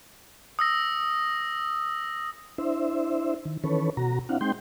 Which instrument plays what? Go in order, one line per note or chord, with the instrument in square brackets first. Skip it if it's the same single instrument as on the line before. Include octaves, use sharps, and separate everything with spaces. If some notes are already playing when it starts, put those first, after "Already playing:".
[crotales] D#6 E6 A#6
[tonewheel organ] D4 E4 C5 E5
D#3
D#3 E3 C#4 A4 B4 C#5
B2 F#4 A#5
C4 D4 E4 F5 F#5
G#3 C4 D#4 G5 C6 G6